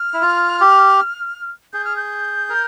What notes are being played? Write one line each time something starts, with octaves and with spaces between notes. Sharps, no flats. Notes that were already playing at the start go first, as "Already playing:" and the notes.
Already playing: F6
E4
F4
G4
G#4 G6
F6
G6
A#4